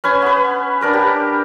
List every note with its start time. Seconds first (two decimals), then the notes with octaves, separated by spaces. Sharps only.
0.04 C#4 B4 G#5
0.22 B3 B4
0.81 D4 A#4 B4
0.93 G4